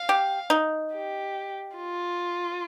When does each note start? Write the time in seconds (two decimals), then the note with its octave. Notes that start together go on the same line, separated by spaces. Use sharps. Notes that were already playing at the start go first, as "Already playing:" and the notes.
Already playing: F5
0.09 G4
0.50 D#4
0.93 G4
1.76 F4